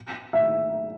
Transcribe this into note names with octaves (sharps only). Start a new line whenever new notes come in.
E5